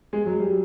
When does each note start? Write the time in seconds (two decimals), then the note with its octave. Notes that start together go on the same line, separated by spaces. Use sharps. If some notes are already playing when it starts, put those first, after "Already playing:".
0.13 G#3
0.26 F#3
0.39 G3